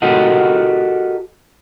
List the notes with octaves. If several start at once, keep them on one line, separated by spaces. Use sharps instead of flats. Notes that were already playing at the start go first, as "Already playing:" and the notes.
F#4 G4 A4 A#4 D#5 F#5